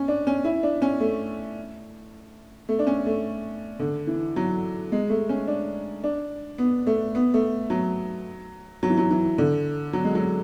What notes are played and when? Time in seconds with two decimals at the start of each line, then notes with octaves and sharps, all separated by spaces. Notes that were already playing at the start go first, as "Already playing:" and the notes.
Already playing: C#4
0.08 D4
0.27 C#4
0.45 E4
0.63 D4
0.82 C#4
1.00 A3
2.69 A3
2.79 D4
2.87 C#4
3.06 A3
3.79 D3
4.07 E3
4.36 F#3
4.92 G#3
5.10 A3
5.29 C#4
5.47 D4
6.04 D4
6.58 B3
6.87 A3
7.15 B3
7.34 A3
7.70 F#3
8.83 F#3
8.90 E3
8.98 F#3
9.11 E3
9.38 D3
9.93 F#3
10.05 G#3
10.15 F#3